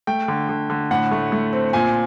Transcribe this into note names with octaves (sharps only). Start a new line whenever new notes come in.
A3 G5
D3
D3
D3
A2 F#5
A3
A3
C4
A#2 G#5